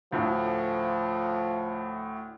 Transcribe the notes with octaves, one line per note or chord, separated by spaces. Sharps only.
D2 A2 F3